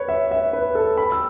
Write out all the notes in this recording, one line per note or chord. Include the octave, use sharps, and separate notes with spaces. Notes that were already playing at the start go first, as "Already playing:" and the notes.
Already playing: B4 C#5
E5
E5
B4
A4
B5
E6